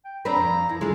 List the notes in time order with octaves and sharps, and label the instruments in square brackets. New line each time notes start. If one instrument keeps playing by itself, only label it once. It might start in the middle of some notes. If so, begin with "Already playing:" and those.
[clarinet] G5
[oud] C4 D4 B4 [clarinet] A#5
[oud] F2
[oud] F2 [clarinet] E4
[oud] D3 G#3 [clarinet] F4